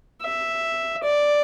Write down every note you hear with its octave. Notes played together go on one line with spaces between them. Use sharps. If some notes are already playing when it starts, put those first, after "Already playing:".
E5
D5